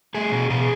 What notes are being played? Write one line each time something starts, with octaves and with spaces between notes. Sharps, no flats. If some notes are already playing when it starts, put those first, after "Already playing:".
A3 G#4
B2
B2 G#4